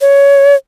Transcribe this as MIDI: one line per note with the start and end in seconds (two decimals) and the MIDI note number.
0.01 0.55 73